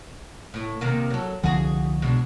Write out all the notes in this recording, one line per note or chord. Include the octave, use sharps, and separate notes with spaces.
A2
C3 D#3 A#3
F#3 A4
C2 D3 F3 F#4 G#4
B2 G#3 D4